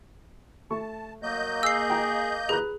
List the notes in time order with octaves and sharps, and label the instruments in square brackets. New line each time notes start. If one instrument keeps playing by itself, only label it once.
[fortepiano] A3 C#6 [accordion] A5
[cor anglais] F#3 [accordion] A#3 D#5 G6
[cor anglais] G#4 [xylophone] E6 C7
[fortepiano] G5 A#5
[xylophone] G#4 [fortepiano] B4 A#5 F#6